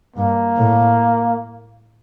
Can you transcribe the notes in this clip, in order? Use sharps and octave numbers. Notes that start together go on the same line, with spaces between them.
G2 A#3
A2